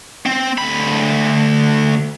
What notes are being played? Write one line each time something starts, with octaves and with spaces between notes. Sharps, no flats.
C4
D2 B5